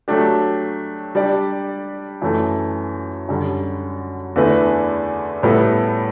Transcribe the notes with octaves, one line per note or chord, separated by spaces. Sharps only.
F#3 A3 D4 G4
G3 D4 G4 D5
F#2 E3 A3
F#2 D3 G3
E2 D3 A3 E4 B4
A2 G3 B3 E4 A4